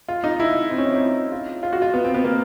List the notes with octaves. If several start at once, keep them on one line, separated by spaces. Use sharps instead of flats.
F4
D#4
E4
C4
C#4
C4
D#4
E4
F4
F4
F#4
F4
B3
C4
B3
A#3